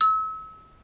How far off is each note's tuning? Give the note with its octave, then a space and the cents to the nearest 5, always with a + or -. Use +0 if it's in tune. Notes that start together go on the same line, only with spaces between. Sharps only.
E6 -35